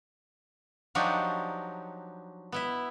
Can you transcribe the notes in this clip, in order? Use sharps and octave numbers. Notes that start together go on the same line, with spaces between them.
F3 F#3 D4 D#4 F#4 G4
B3 E4 E5